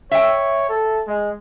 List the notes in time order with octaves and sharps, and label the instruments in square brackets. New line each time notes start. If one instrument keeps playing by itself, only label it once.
[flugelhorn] C#5 [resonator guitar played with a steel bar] E5 G5
[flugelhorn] A4
G#3